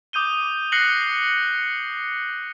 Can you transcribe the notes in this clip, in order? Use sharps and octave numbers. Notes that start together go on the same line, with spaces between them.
D6 D#6 G6 D#7 G7
F#6 A#6 C7 C#7 F#7 G7